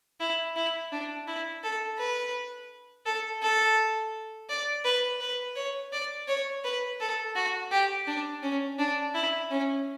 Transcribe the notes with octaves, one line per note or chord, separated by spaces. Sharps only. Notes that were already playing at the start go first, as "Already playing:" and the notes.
E4
E4
D4
E4
A4
B4
A4
A4
D5
B4
B4
C#5
D5
C#5
B4
A4
F#4
G4
D4
C#4
D4
E4
C#4